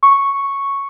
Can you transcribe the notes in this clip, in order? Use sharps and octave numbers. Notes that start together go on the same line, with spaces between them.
C#6